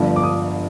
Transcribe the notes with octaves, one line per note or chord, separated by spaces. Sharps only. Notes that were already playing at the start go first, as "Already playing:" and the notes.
Already playing: G1 G2 D3 F3
D6
D#6